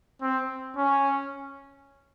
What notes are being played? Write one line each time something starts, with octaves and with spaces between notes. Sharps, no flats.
C4
C#4